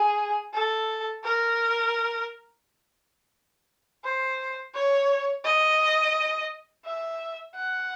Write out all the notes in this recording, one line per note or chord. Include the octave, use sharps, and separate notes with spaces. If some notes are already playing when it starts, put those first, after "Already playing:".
Already playing: G#4
A4
A#4
C5
C#5
D#5
E5
F#5